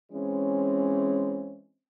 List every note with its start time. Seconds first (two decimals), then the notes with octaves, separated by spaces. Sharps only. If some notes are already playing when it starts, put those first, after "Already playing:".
0.12 E3 G#3 C4 C#4